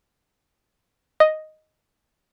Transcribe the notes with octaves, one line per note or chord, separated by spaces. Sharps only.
D#5